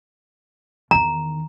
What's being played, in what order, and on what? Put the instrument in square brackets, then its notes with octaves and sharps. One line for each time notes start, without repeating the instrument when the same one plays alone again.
[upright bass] E2 D#3 [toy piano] A#5